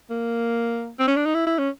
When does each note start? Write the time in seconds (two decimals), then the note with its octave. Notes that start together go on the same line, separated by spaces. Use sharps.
0.10 A#3
0.99 C4
1.08 C#4
1.16 D4
1.26 D#4
1.34 E4
1.46 E4
1.58 C#4